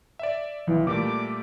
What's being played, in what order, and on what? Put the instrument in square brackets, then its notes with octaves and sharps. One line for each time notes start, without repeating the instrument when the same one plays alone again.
[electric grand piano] D5 E5
[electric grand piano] B1 [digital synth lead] E3
[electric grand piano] A#2 G3 A3 [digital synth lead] D6